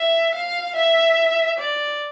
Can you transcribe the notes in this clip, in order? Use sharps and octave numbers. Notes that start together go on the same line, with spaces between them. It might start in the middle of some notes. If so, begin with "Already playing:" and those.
Already playing: E5
F5
E5
D5